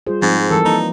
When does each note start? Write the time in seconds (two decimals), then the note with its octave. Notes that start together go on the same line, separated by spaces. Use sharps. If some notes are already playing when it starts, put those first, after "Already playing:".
0.07 G3 F4 G#4 C5
0.22 G#2 F3 C4
0.51 E3 G3 A4 A#4
0.65 A#3 D#4